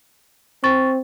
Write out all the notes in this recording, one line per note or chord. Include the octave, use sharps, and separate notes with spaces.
C4 C#6 A6